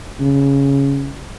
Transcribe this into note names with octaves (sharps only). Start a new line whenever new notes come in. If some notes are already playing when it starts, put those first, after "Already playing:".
C#3